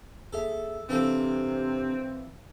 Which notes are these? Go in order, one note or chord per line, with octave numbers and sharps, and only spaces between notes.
D#2 G#4 A4 E5
C3 E3 C4 D4 F4 A4